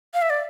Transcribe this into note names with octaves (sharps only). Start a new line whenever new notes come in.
F5
E5
D5